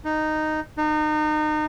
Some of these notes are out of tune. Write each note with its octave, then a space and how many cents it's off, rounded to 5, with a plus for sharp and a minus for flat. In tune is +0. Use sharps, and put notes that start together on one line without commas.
D#4 -10
D#4 -30